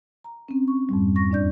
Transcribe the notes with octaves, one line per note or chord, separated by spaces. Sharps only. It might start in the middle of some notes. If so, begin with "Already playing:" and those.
A#5
C4 C#4
C#6
F2 G#2 G3
C#6 A#6
E2 D4 D5 G6